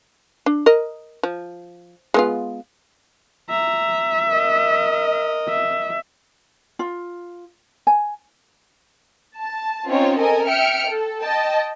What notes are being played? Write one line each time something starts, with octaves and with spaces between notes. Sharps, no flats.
D4
A#4 D#5
F3
G#3 B3 F4
E5 A#5
A#4 D#5
E5
F4
G#5
A5
C4 C#4 D#4 F4 C#5 G5
A4 A#4 D#5 G#5
E5 G5 F6 C#7 D7
A4
D#5 G5 A5